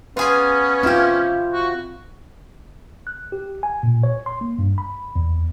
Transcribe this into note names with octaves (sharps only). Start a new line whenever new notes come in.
B3 C#4 F4 G#4 G#5
C4 E4 F4 G4
F#4
F#6
G4
G#5
A#2
C#5
C6
A#3
G2
B5
E2